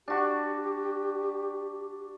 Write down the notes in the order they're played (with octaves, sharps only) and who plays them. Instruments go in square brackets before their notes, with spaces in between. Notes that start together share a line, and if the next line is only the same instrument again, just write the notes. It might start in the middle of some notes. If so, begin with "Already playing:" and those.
[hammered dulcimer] D4 F#4 [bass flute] G4